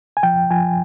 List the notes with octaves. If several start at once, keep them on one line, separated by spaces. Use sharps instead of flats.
G#5
F3 G5
F3 G#5